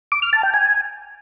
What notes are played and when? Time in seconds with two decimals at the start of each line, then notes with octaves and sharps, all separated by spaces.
0.12 D6
0.22 F6
0.33 A5
0.43 G5
0.54 G#5